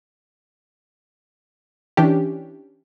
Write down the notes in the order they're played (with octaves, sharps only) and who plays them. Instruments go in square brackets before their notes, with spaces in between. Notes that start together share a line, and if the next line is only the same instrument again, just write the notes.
[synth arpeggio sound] E3 C#4 D4 G4